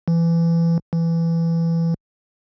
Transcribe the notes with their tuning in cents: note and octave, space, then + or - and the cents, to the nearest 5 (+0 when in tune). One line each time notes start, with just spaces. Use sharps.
E3 +25
E3 +15